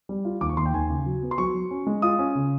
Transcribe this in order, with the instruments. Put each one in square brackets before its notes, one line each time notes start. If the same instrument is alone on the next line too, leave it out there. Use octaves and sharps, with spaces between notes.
[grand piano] G3
F4
D#2 D6
C#6
D#2 C6
G5
D#2 G#5
C#3
F#3
B3
C6
F#3 C#6
F#3
C#4
G#3
F4 D#6
C#4
C#3